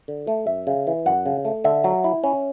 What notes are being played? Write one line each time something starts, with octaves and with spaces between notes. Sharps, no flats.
D3
A3
F#2 E5
C#3
E3
F#2 F#5
C#3
A3
D3 E5
F#3
E4
C#4